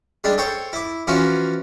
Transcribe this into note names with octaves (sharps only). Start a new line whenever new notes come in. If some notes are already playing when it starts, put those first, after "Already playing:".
G3 G#3 D4
A4 C5 C#5 G5
E4 D6
E3 F3 C#4 F4 F#4